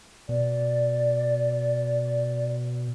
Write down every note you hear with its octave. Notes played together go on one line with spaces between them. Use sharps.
B2 D5